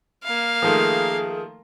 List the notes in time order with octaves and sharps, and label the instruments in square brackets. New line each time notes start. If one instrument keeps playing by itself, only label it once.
[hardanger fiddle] A#3 F5
[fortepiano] D#3 F3 A3 [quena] G#4